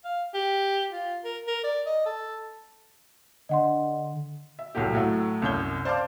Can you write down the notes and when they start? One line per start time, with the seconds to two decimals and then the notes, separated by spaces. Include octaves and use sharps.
0.05 F5
0.34 G4
0.92 F4
1.25 A#4
1.47 A#4
1.64 D5
1.86 D#5
2.06 A4
3.49 D3 D#5 F#5 C6
4.59 E5
4.75 C2 A2 F#3 A3 G4
4.93 A2 F#3 A3
5.42 C2 F#2 C#5 G6 G7
5.85 C5 D5 F5 A5 C6 D6